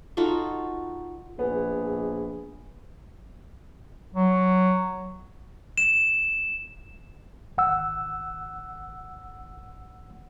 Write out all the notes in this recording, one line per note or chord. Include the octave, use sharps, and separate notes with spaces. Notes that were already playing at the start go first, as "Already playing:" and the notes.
D#4 F4 F#4 A4
A#1 B3 G#4
F#3
E7
G#1 F#5 E6